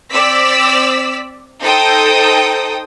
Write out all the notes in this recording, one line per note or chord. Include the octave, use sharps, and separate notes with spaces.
C4 D5 E6 B6
D#4 A4 C5 G5 D#6